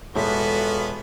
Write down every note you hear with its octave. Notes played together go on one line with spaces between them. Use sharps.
E1 B3 F4 F#4 A4 E5